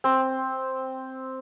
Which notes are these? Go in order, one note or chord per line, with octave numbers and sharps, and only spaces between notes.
C4